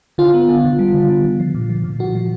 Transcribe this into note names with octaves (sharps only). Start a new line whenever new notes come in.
D3 F4
B3
D3
D3
G3
D3
D3
D3
F3
A#2
F3
A#2
F3 F#4
F3